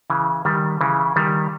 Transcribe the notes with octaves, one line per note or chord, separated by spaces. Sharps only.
C#3 E3
D#3 G3
C#3 E3
D#3 G3